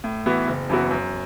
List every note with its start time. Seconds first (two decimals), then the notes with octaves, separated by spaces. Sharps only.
0.04 A2
0.26 E3 B3 F#4
0.47 F#1
0.69 F#2 E3 B3 F#4
0.91 F#2